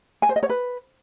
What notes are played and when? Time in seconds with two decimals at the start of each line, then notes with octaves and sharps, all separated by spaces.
0.22 G#5
0.29 C5
0.36 D#5
0.43 C#5
0.49 B4